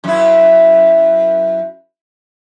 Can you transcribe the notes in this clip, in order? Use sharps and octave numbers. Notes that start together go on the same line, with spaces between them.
F#2 E4